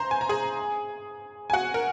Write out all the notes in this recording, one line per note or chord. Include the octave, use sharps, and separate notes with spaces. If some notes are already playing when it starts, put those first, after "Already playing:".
Already playing: C5 A#5 C6
G#5
A#5
G#4 G#5
G#5
F#4 F#5
A#4